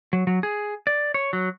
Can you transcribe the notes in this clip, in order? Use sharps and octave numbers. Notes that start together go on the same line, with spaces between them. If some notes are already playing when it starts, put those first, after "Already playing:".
F#3
F#3
G#4
D5
C#5
F#3